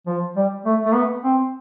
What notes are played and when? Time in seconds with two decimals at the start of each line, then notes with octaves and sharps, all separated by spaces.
0.07 F3
0.36 G3
0.66 A3
0.85 A3
0.94 B3
1.24 C4